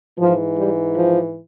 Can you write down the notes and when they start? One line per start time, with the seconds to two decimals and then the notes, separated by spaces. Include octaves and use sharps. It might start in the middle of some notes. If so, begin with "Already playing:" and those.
0.18 G#2 E3 F3
0.57 G3
0.95 F3